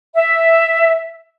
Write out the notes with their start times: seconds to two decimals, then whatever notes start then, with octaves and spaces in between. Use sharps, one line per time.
0.15 E5